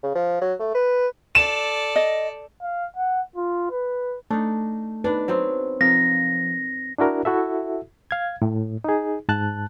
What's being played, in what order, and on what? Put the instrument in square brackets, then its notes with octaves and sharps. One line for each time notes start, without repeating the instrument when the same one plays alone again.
[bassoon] C#3
F3
F#3
A3
B4
[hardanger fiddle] A4 D5 [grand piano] E7
[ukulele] D#5
[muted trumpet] F5
F#5
F4
B4
[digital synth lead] A3 [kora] D4 D#4
[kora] D4 D5 [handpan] D#4 B4
[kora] F#3 B3 C4
[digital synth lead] F3 [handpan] C4 [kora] A#4 [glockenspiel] A#6
[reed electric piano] D4 E4 F#4 A#4
E4 F#4 A4 E5
F5 G#6
A2
D#4 G#4
G#2 A5 F#6